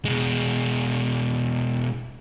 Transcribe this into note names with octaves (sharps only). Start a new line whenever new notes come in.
B2 G#3